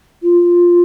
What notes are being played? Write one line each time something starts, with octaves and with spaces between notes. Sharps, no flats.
F4